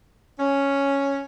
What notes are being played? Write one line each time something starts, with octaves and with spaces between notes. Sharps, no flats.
C#4